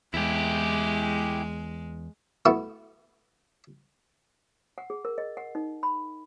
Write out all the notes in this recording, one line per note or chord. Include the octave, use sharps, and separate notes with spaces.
E2 G#3 E4 G4
A3 B3 E4 F#4
F#5
G#4
A#4
D#5
F#5
D#4
B5